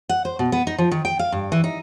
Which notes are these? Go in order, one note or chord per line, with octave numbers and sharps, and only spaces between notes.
F#5
C5
B2
B3
D#4
F3
D#3
G5
F5
G2
E3
D#4